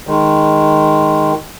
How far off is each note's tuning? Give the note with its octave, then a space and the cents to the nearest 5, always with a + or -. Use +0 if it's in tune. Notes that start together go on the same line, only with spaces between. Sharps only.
D#3 +0 G#3 -5